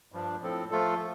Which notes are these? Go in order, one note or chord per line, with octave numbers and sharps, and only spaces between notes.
G2 F3 D4
A2 F3 C4 A4
F3 A3 F4 A4